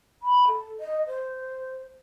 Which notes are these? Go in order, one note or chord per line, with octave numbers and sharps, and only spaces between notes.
B5
A4
D#5
C5